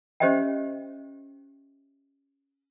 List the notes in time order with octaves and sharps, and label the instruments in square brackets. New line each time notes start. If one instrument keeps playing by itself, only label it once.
[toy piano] C#4 G4 C5 D#5 E5 G5